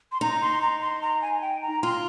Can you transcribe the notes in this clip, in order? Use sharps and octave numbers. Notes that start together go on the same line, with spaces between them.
C6
D#4 A#5
C6
A#5
C6
A#5
G#5
G5
A#5
F4 C6